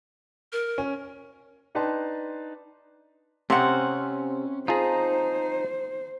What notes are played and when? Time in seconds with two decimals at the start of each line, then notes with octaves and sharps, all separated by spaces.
0.52 A#4
0.78 C#4
1.75 D4 D#4 B4 G5 A5 C6
3.50 C3 C4 C#4 F#5
4.68 D#4 F4 G#4 C5 A5 A#5